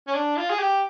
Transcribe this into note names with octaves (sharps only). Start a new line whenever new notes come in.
C#4
D4
F4
G#4
G4